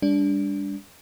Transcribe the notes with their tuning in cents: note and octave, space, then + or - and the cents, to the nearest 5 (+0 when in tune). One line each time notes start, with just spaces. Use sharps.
G3 +40 D4 -20